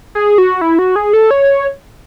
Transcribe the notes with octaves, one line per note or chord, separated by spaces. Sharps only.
G#4
F#4
E4
F#4
G#4
A4
C#5